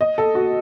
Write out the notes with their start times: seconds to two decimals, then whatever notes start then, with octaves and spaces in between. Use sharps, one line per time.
0.01 D#5
0.18 A4
0.35 F#4